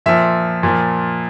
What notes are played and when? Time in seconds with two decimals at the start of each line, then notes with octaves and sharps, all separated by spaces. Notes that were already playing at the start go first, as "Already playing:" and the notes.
0.06 A#2 F3 E5
0.63 A#2 F3